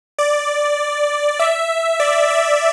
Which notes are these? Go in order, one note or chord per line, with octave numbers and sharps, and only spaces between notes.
D5
E5
D5
E5